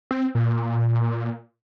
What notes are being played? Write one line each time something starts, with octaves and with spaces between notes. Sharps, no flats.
C4
A#2